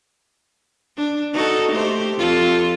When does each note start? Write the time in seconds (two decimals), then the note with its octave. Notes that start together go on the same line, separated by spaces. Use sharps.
0.97 D4
1.33 D#4 F#4 A4
1.72 A3 G4 C5
2.17 F2 F4 A4